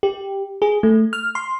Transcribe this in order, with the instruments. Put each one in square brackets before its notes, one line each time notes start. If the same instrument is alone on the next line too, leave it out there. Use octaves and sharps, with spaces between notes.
[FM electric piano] G4
G#4
A3
F6
C6